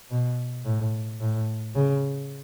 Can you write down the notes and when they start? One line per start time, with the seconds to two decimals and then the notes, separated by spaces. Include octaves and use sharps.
0.11 B2
0.65 A2
1.20 A2
1.75 C#3